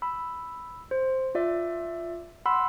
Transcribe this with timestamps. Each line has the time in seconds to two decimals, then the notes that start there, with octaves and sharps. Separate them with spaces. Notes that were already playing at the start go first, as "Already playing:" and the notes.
0.02 B5 E6
0.91 C5
1.35 F4 D5 E5
2.46 F#5 B5 C6 E6